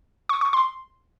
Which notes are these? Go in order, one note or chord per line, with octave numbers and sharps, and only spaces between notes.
C#6
C#6
C6